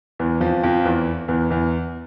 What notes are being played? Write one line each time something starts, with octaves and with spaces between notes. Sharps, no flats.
E2 E3
F2 F3
F2 F3
E2 E3
E2 E3
E2 E3